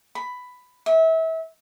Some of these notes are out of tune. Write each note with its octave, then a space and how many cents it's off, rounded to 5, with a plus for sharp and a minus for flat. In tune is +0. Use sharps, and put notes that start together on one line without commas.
B5 +10
E5 -30